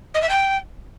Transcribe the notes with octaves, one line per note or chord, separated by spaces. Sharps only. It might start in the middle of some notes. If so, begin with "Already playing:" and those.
D#5
E5
G5